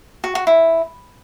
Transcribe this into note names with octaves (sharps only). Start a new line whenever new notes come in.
F#4
F#4
E4